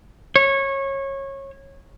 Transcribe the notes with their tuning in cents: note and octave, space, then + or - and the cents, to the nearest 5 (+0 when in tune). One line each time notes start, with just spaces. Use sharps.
C#5 -20